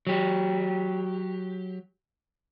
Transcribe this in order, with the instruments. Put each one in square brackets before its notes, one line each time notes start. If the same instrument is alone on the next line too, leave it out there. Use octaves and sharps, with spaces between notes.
[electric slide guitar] F#3 G4